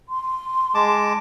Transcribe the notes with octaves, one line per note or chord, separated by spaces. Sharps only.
C6
G#3 A5 D6